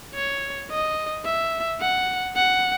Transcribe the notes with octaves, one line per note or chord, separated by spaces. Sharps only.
C#5
D#5
E5
F#5
F#5